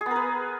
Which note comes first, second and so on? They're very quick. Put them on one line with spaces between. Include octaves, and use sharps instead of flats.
G#4 B3 A#4 B4